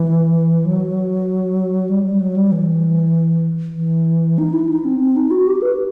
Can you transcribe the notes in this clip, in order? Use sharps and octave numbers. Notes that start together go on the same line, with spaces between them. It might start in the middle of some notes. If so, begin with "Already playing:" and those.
Already playing: E3
F#3
G3
G3
F#3
G3
E3
E3
D#4
E4
D#4
C4
C4
D#4
F#4
G4
B4